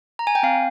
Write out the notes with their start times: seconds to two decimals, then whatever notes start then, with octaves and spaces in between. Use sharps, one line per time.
0.19 A#5
0.27 G#5
0.35 G5
0.43 C4 F5